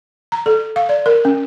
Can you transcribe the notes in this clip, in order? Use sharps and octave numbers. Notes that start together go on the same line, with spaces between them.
A#5
A4
F5
D5
A#4
C#4